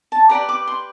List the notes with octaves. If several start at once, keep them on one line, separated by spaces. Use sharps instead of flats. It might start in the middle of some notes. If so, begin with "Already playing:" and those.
A5
G4 B4 D5 A#5
D6
C6